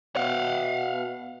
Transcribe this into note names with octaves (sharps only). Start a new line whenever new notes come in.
B2 F5 F#5